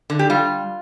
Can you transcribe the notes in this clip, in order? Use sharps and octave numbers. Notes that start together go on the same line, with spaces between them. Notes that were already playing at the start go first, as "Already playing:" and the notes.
D3
G4
G3 F4